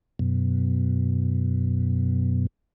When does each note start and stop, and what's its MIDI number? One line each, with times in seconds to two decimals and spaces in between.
0.19 2.47 42
0.19 2.47 47